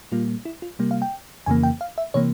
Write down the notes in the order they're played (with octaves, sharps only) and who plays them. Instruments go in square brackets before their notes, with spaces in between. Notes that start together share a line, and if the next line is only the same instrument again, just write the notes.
[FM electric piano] A#2 G3 A#3 F4
E4
F4
C3 G3 A#3
F5
G5
F2 C#3 E3 A#3 G#5
G5
F5
E5
C3 E3 A#3 C#5